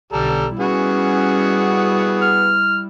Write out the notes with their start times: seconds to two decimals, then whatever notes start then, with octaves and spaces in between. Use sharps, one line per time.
0.13 B1 D3 G3 A4 A#5
0.59 G3 B3 C#4 E4 F#4 G#4
2.21 F6